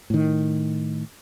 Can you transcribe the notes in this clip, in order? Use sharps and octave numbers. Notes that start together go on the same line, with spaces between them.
A2 D#3